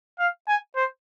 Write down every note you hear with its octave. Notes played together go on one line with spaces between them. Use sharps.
F5
G#5
C5